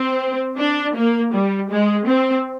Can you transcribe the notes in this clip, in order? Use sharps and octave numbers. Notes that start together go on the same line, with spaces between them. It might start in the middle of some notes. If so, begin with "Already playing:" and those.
Already playing: C4
D4
A#3
G3
G#3
C4